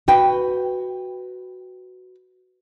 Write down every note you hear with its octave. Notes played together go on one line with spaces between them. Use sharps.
F#4 B4 G5